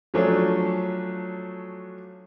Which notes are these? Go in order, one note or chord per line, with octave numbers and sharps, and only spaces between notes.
F3 F#3 A3 C#4 D4